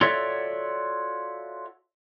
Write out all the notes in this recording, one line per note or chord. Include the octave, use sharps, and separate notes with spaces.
F4 F#4 A4 C#5 D5 E5